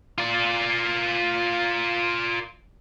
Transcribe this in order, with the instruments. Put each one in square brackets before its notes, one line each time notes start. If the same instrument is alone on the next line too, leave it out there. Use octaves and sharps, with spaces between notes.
[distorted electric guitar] F4 D5